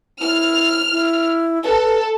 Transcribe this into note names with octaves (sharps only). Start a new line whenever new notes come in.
E4 F6
E4
A4 B4